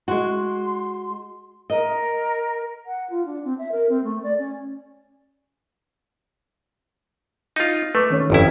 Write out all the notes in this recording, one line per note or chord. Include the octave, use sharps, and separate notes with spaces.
G#3 F#4 C6
A#4 D#5
F#5
F4
D4
C4
E5
A#4
C4
A3
D5
C#4
D#4 F4
A3 B4 D6
D#3 C#4 C#5
G1 F2 E4